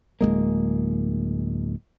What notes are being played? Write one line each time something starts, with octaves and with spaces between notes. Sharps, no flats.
D1 G2 G#3 A#3